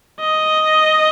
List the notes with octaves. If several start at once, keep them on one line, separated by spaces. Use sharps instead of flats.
D#5